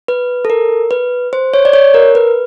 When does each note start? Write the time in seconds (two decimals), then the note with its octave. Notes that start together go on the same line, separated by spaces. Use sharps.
0.08 B4
0.45 A4
0.50 A#4
0.91 B4
1.33 C5
1.54 C#5
1.65 D5
1.73 C#5
1.94 A#4
2.15 B4